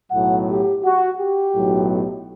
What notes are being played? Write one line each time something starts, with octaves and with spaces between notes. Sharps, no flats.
B1 A2 F#3 F#5
G4
F#4
G4
B1 A2 F#3